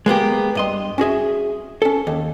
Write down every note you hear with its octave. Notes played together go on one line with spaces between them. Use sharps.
G#3 A#3 B3 G4
G2 D#5 C6
C#4 F#4 G#4 E5
C#4 A4
D#2